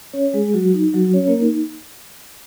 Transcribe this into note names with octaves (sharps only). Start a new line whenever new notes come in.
C#4 C#5
G#3 G#4
F#3 F#4
D#4
F#3 F#4
C#4 C#5
A#3 A#4
D#4